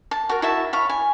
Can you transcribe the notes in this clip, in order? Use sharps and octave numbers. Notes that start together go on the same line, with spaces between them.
A5
F#4 A#4
E4 F#4 E5 A5
C#5 F5 B5
G#5